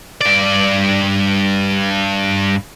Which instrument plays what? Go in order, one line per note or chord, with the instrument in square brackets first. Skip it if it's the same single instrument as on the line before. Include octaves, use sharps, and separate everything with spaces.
[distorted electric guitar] G2 D5